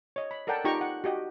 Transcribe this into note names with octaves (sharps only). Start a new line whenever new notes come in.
C#5 D#5
B5
A4 A#4 D5 F#5 G5 A5
D#4 F4 G4 G5 A#5 C#6
F#5
F#4 G4 D#5